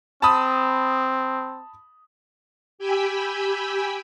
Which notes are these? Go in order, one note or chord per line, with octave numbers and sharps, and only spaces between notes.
C4 A5 B5 D#6
G4 G5 G#5 B5 E6